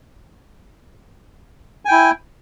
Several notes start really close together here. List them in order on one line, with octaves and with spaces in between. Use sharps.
G#5 G5 E4